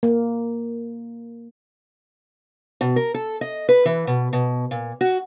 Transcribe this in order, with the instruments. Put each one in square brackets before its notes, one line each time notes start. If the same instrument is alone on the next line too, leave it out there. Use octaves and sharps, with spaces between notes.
[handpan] A#3
[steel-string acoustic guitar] B2
A#4
A4
D#5
B4
E3
B2
B2
A#2
F#4